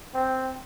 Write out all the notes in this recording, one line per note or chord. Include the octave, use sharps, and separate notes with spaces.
C4